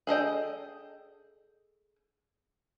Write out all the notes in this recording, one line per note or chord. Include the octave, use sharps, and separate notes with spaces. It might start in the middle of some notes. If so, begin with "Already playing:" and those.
G#4 A4 D#5 G5